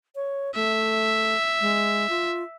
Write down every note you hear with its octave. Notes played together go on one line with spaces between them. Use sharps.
C#5
A3 E5
G#3
F4